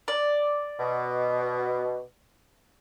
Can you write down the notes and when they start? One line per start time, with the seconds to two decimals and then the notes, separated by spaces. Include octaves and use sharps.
0.08 D5
0.79 B2